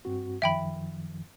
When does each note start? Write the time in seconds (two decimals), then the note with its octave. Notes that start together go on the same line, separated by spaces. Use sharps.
0.05 G2 C4 F#4
0.42 F#2 D#3 F3 E5 G5 B5